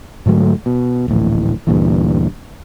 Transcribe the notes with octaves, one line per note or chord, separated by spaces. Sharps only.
G#2 D3 F#3 A3
B2
D1 A#1 A2 E3
D2 G2 A#2 E3